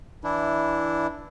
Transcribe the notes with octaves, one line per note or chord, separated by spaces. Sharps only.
E3 D4 E4